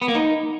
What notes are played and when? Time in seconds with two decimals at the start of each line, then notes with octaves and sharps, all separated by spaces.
0.02 B3
0.08 A#3
0.15 D#4